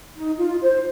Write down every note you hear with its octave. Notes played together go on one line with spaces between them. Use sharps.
D#4
F4
C5